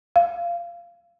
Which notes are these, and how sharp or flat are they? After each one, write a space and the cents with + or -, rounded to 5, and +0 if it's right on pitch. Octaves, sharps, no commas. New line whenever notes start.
F5 -20